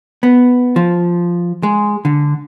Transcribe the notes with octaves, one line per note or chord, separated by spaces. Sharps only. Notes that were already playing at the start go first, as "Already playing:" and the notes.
B3
F3
G#3
D3